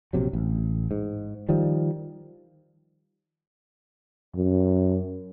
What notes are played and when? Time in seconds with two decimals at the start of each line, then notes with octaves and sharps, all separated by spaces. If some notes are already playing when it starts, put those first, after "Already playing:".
0.13 A#1 C3 F#3
0.33 A1
0.91 G#2
1.49 D#3 F3 G3
4.35 F#2